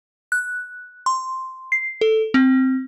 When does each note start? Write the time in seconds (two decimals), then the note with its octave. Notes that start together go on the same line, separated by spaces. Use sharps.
0.32 F#6
1.06 C6
1.72 C7
2.01 A4
2.34 C4